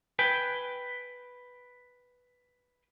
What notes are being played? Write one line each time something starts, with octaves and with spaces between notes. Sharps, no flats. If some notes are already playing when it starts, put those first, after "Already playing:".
B4 G5 G#5